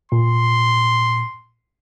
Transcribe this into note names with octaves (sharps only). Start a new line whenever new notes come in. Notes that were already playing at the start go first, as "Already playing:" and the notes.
A#2 C6